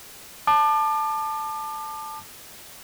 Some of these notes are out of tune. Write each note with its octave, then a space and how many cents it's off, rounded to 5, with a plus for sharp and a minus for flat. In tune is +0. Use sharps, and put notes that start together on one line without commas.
A5 +0 D6 +35